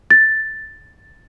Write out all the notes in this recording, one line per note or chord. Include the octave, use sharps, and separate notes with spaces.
A6